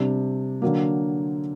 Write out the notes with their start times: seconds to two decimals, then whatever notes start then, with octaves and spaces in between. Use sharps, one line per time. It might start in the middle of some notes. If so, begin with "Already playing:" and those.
Already playing: C3 G3 D4
0.62 D3 F#3 A#3